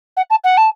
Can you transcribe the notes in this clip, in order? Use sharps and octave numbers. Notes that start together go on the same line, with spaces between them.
F#5
A5
F#5
A5